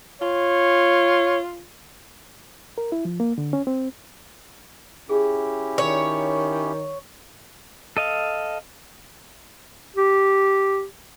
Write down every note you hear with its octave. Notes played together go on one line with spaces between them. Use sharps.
F4 C#5
A#4
E4
F3
A#3
D3
C#4
C4
C#4 E4 G4 G#4
D#3 A#4 C#5
A4 D#5 F5
G4